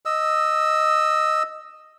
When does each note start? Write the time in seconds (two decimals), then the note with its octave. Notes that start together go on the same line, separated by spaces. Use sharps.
0.05 D#5 E6